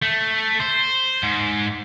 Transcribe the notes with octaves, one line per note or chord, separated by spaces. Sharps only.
A3
C5
G#2